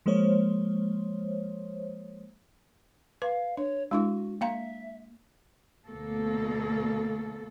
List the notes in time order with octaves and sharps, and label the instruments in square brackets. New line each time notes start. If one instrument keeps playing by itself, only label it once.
[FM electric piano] F3 G#3 A#3 C5 C#5
[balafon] B4 [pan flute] F5
[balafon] D4 [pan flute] C#5
[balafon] G#3 D4 E4 [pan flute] F#4
[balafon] A#3 F5 A#5 [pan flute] E5
[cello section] D2 B2 A#3 A4